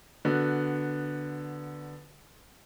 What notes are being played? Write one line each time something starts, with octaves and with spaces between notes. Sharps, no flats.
D3 B3 F#4